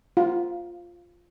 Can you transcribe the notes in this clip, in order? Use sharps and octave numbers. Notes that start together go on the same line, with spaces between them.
F4